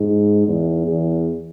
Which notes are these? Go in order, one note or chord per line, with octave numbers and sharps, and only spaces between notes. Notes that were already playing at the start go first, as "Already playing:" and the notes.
Already playing: G#2
E2
E2